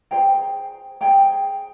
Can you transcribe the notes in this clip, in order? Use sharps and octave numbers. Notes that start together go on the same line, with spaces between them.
G#4 C5 G5 A#5
G#4 C5 G5 A#5